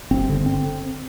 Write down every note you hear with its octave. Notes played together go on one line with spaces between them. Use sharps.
G1 C4
D3
C4